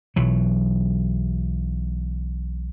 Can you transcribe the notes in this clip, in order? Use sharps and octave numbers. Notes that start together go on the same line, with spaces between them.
B1 E3 F#3